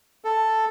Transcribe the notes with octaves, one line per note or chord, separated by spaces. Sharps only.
A4